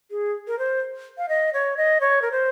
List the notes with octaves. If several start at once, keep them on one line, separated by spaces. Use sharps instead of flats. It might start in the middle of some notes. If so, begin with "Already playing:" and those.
G#4
A#4
C5
F5
D#5
C#5
D#5
C#5
A#4
C5